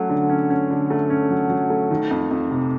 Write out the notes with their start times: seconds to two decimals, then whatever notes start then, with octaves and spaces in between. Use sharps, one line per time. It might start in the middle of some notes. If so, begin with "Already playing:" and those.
Already playing: F#3 A3 C#4
0.09 D3
0.30 C#4
0.50 C#4
0.70 D3
0.90 A3
1.10 C#4
1.30 F#3
1.50 F#3
1.70 A3
1.91 D#3
2.11 F2
2.31 F2
2.51 C3